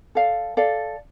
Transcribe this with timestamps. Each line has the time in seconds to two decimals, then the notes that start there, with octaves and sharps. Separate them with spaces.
0.15 A4 D5 F5
0.57 A4 D5 F5